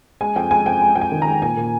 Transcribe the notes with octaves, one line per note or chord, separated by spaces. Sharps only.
G#3 G#5
F2 G5
G#3 G#5
F2 G5
G#3
F2 G5
G#5
D#3
G#3 A#5
A#2 G#5
A#2